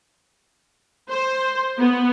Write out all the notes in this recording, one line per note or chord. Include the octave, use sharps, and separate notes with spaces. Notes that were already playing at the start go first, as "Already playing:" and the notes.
C5
B3